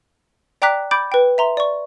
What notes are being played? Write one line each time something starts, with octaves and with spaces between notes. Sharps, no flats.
D5 G5 A#5 D6 F#6 B6
B5 D6 G6 A6 D7
B4 G5
E5 A#5 C6
D5 C#6